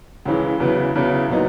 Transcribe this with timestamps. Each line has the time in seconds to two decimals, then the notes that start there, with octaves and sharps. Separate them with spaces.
0.25 C#2 C#3 E3 G#3
0.60 E2 C#3 F#3 B3
0.95 E2 C#3 F#3 B3
1.29 A#2 F#3 B3 D#4